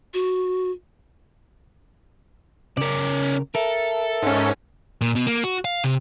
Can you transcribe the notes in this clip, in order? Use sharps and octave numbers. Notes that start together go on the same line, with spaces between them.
F#4
C#3 C#4 A#4 D5
A4 A#4 E5
G#2 C#4
A#2
B2
A#3
F#4
F5
C3